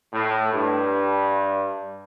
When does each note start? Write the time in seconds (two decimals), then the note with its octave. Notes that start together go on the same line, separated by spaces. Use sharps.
0.12 A2
0.53 G2